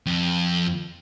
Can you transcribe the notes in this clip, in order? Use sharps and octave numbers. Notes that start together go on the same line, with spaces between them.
F2